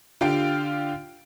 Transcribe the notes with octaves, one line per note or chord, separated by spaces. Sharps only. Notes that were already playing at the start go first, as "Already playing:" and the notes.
D3 F4 G4 F5 G5 D7